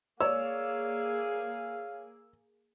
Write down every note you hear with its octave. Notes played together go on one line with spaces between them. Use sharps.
A#3 G#4 C#5 D5 F5 E6